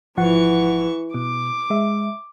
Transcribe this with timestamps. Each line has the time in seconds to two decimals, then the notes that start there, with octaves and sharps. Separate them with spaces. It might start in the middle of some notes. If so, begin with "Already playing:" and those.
0.17 G#1 E3 F3 F#5 C#6
1.14 B2 D6
1.70 G#3 E5